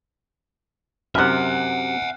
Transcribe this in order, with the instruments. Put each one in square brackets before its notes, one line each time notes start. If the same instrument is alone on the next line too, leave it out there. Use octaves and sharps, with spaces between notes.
[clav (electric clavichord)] F#2 C3 [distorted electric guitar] E5 F#5 [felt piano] F6 F#6